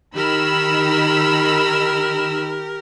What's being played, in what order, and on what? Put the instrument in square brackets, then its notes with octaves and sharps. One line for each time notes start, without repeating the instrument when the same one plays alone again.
[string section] D#3 B5 E6 [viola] G4 A#4